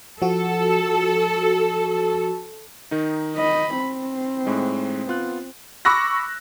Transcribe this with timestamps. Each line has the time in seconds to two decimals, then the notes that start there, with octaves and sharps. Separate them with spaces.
0.22 F3 F#4 A4
2.91 D#3 D#4
3.36 D#5 B5
3.80 C4 B5
4.46 A2 G#3 D#4
5.07 B3 F4 F#6
5.85 B5 C#6 D6 E6 F#6 A#6